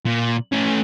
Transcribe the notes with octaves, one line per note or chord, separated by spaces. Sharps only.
A#2
A3 C#4